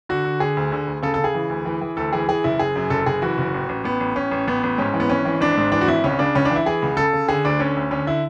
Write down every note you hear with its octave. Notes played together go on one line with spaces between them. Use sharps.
D3 F#4
D3
D3 G#4
D2
D3
D2
C#3 A4
C#3 A4
G#4
E3
D2
E3
E3
D2 A4
E3 G#4
E3 G#4
F#1 E4
F#1 G#4
F#2
F#1 A4
F#1 G#4
E3 F#4
F#1
A1
A1
A1 B3
A1
A1 C#4
A1
A1 B3
A1
G#2 C#4
E3
B3
G#1 C#4
E3
G#1 D4
G#2
E3 D4
F#4
G#1 E4
C#2 C#4
C#3 D4
C#2 C#4
D4
E3
E4
E3 G#4
C#2
C#3 A4
C#3
D3 G#4
D2 D4
D3 C#4
D2
D3 C#4
D3 E4